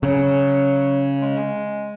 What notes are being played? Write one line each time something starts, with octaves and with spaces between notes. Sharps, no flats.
C#3 F#3
G#3